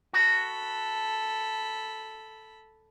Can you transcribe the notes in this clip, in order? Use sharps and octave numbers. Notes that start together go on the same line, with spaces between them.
F#4 A4 B5